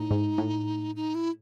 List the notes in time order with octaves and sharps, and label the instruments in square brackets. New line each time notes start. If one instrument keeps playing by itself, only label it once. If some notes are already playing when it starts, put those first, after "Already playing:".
Already playing: [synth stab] A2 [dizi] D#4
[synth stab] G#2
A2
[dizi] D#4
E4